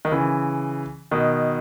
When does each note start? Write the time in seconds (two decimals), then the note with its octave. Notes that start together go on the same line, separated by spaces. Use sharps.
0.05 D#3
0.12 C#3 E3
1.11 B2 D#3